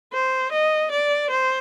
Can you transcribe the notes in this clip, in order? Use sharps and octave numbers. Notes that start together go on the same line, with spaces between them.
C5
D#5
D5
C5